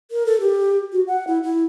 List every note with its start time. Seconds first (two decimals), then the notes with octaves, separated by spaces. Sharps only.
0.11 A#4
0.26 A4
0.40 G4
0.93 F#4
1.07 F#5
1.27 E4
1.43 E4